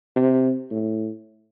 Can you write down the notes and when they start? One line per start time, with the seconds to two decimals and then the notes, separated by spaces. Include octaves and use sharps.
0.16 C3
0.71 A2